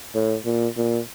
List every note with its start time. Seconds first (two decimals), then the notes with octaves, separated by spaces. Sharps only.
0.15 A2
0.45 A#2
0.77 A#2